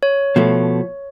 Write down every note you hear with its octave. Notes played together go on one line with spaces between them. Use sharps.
C#5
B2 F3 A3